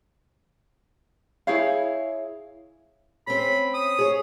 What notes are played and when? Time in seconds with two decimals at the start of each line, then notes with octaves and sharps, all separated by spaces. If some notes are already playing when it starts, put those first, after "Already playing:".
1.47 E4 G#4 C#5 F5
3.27 C4 C#4 B5
3.74 D#6
3.99 G#4 C#5